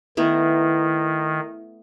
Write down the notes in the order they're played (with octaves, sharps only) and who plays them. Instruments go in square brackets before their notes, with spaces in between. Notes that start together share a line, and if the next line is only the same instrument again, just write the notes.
[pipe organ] D#3 [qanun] A3 B3 E4